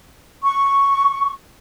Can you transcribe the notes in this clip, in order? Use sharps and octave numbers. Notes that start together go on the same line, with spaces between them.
C#6